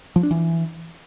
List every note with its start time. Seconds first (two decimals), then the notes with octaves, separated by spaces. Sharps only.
0.16 F3
0.23 D4
0.31 E3